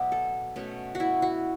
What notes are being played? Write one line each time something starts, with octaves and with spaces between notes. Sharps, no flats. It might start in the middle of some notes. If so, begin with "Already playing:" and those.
Already playing: B2 F#3 B3 D5 E5
A4
B2 A3 C#4
F#4
E4
F#4